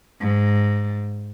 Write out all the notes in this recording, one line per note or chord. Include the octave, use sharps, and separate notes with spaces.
G#2